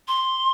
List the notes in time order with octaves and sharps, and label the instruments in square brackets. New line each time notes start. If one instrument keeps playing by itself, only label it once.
[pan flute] C6